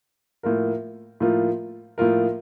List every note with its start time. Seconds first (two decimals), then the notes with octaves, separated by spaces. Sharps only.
0.43 A2 F3 A#3 F4 A#4
1.20 A2 F3 A#3 F4 A#4
1.98 A2 F3 A#3 F4 A#4